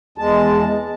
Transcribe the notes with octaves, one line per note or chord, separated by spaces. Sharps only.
E2 G#3 A5